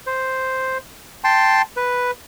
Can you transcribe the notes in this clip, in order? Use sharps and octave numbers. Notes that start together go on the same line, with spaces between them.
C5
G5 A5 C6
B4